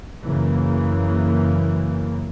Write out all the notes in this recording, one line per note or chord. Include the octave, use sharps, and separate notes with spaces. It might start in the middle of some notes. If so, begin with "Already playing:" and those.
F#2 C#3 E3 A#3